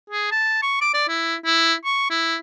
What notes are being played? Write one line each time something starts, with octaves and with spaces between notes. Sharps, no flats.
G#4
A5
C#6
D6
D5
E4
E4
C#6
E4